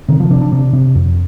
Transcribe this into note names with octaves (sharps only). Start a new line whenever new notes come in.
C3 D#3
F3
C3 D4
D4
C3 D4
C3
F2